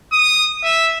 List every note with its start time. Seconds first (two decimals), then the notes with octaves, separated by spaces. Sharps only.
0.13 D#6
0.64 E5